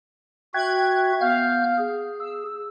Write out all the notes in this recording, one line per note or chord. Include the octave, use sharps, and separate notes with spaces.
F#4 E5 G5 F#6 G#6
B3 F5 F6 G6
G#4
E6